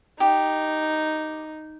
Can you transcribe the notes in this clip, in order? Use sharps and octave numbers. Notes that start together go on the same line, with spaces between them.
D#4 G4